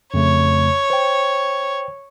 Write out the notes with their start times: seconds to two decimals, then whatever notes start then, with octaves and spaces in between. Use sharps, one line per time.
0.14 F2 C#3 A3 C#5
0.90 C5 G5